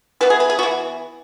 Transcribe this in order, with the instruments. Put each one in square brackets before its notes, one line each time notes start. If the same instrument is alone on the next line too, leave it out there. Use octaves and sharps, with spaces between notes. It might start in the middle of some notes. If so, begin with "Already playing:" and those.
[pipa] E3 B3 B4
G#4
B4
G#4
E3 B3 F#4